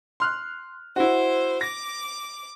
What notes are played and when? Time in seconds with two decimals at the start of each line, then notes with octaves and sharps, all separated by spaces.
0.20 C6 F6 F#6
0.96 E4 F#4 C5
1.61 D6 A#6